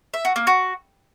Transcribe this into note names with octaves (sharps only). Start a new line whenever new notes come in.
E5
F#4
A#3
F#4